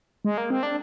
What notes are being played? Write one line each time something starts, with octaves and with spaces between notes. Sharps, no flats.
G#3
A#3
C4
D4